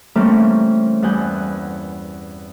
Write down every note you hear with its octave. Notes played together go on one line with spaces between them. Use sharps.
E3 G3 A3 A#3 C4 C#4
E2 G2 F#5 G#5 G6